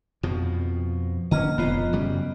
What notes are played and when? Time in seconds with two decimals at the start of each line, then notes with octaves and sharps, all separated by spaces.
0.23 F2 B2 F3
1.31 D3 A#3 C#4 D#5 A#5 F6
1.58 E1 F2 A#2 B3 F4 D#5
1.93 F#2 C#3 G3